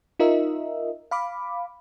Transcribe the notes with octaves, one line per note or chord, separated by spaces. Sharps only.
D#4 F4 A#4 D#5 E5
F5 B5 D6